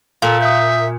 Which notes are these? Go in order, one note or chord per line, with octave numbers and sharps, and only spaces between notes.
A#2 A4 F5
E5 D#6 G6